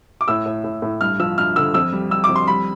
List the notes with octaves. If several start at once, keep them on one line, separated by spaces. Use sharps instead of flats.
D6
A2 E6
A2
A2
A2
G2 F6
F3 E6
G2 F6
D3 E6
F2 E6
G3
G3 E6
D6
F2
C6
G3 B5